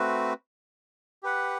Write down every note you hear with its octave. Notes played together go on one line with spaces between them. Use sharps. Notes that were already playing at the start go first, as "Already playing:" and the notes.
Already playing: A3 C4 F#4 B4
G4 B4 F#5